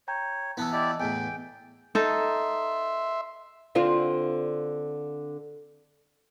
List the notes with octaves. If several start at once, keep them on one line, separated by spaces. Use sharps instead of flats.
C#5 G5 A#5 G6
E3 B3 E4 A5 E6
E4 G4 D5 D#5
E2 A2 G5 G#5
D#4 A4 E5 C6
D3 C4 F4